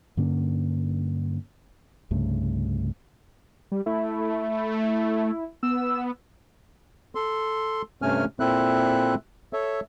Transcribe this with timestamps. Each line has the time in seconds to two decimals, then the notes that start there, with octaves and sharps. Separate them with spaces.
0.17 G2 D3 A#3 C#4
2.11 C2 G2 C#3 A3
3.72 G3
3.86 A3 E4
5.63 B3 E6
7.15 A4 C6
8.02 G2 C3 A3 C#4 G#5 F6
8.40 A#2 C4 E4 A4 E5 F#6
9.53 A4 C#5 E5